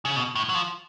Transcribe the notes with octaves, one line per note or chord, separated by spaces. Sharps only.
C#3
B2
A2
F#3
F3